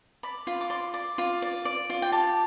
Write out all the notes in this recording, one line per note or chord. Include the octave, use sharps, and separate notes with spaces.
D5 B5
F4
D6
D5 C6
D5
F4
D5
D5
F4
G5
G4 A5